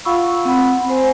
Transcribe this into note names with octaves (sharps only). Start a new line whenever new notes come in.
F4 F5 F#5 B5 C#6 E6
C4 F#5 B5
C4 C5 G#5